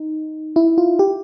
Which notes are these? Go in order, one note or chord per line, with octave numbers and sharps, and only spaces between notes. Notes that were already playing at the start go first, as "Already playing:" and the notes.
Already playing: D#4
E4
F4
G4